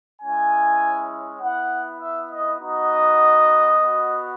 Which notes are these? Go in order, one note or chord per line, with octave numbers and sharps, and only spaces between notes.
G#3 C#4 E4 G#5
B3 E4 F#5
E5
D#5
B3 D#4 F#4 D#5
B3 F#4